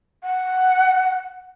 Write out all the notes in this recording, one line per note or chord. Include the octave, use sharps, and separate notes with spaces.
F#5